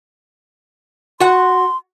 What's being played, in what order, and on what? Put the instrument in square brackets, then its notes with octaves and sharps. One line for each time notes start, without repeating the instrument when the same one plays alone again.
[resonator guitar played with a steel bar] F#4 F#5 [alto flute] C6